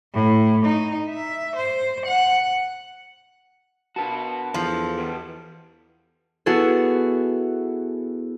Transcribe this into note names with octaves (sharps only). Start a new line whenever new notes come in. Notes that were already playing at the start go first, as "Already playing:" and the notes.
A2
D#4
E5
C5
F#5
D4 F#4 A#4 B4 A5
E2 F3 A4
B3 G4 B4
B3 E4 F#4 G#4 A4